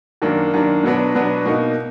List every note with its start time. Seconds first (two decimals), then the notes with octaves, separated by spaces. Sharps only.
0.22 F#2 D#3 A#3 D4
0.54 F#2 D#3 A#3 D4
0.83 B2 F#3 B3 D4
1.15 B2 F#3 B3 D4
1.46 B2 A#3 D#4